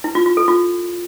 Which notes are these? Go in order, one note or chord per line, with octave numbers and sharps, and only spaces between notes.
E4
F4
F4
A4
F4